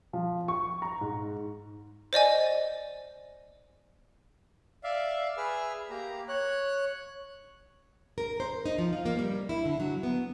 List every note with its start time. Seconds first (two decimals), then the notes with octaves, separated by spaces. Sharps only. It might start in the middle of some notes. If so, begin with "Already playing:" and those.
0.13 F3
0.48 C#6
0.82 A#5
1.01 G#2
2.13 C5 D5 D#5 G#5
4.84 D5 E5 F5
5.37 G#4 B4 E5 E6 F6
5.90 A#3 G4 A#5
6.28 C#5 F#6
8.18 A#4
8.40 C5
8.65 D#4
8.78 F3
8.93 F4
9.06 A#3
9.19 G3
9.49 E4
9.65 D3
9.80 F#3
10.03 B3